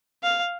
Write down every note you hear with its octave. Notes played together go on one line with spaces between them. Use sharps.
F5